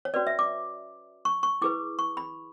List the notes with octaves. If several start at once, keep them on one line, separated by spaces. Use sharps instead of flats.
C#5
C#4 F#4 B4 D5
E5
D6
C#6
C#6
E4 G#4 B4 D6
C#6
B5